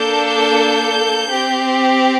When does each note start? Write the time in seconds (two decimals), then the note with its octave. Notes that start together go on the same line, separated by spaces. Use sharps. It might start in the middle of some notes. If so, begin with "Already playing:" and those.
Already playing: A#3 D4 A4 G6
1.30 C4 G4